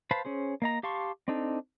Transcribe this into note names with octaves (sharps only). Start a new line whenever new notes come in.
B4 C5 F5 A5 B5
C#4 G#4 C5
A#3 D#5 A#5
G4 F5 A5 C6 C#6
C4 D4 D#4 A4